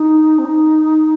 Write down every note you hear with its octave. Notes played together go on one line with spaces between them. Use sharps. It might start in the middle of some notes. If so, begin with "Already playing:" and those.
Already playing: D#4
C4
D#4